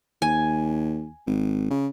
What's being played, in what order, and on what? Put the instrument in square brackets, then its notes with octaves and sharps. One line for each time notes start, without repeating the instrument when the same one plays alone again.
[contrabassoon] D#2 [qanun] G#5
[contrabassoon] G#1
C#3